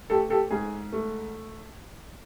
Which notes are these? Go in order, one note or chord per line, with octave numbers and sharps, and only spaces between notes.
A3 G4 A4
G4 A4
G#2 G#4
A3